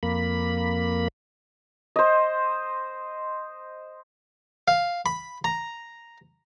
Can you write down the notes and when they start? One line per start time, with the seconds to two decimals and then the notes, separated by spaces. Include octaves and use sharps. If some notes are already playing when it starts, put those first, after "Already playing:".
0.03 F2 A#3 B5
1.96 C5 D#5
4.68 F5
5.06 B5
5.44 A#5